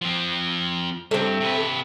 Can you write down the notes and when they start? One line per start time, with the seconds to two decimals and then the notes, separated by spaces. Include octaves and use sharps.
0.02 F3 C4
1.11 G2 A3 C4
1.41 C3 B4